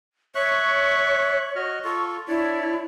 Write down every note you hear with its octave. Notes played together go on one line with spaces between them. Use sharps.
C#5 E5 C#6 F#6
F#4 D#5 F6
F4 A4 C#6
D4 E4 C#5 D5